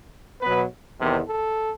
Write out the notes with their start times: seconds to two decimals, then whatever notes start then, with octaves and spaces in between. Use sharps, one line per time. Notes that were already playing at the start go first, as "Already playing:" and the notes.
0.42 B2 F#3 B3 B4
1.00 E2 C3 D#3
1.28 A4